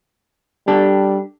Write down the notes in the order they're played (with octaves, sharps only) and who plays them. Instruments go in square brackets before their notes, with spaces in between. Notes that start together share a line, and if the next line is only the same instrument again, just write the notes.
[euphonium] G3 [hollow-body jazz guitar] D4 G4 A4